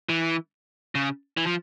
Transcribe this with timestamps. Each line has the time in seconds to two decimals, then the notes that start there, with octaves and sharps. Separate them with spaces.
0.09 E3
0.95 C#3
1.37 E3
1.46 F3